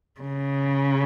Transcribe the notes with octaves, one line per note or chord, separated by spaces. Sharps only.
C#3